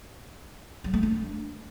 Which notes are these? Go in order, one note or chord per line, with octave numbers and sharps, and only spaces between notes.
F#3
A3
D4